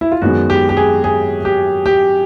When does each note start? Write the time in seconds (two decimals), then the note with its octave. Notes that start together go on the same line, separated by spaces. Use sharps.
0.01 E4
0.12 F4
0.22 F#2 D#3 G#3 B3 F#4
0.50 G4
0.69 G4
0.77 G#4
1.04 G#4
1.45 G4
1.86 G4